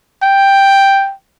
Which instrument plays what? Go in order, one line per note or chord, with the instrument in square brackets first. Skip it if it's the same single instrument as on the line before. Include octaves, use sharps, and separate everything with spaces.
[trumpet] G5